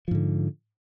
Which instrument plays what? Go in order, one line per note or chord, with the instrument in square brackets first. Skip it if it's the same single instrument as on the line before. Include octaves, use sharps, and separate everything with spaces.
[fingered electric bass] F3
G#2
D3